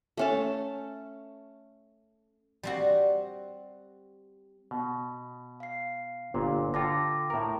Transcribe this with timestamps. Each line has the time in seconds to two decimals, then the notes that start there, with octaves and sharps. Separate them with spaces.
0.17 A3 C#4 A5
2.63 G3 C4 F#4
4.71 B2
5.60 F5 C7
6.34 G1 A#2
6.74 D3 F4 A4 G5 D6 A#6
7.30 A2 A#4 A#5